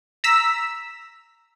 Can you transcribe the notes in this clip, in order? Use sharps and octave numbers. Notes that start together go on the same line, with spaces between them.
A#5 E6 B6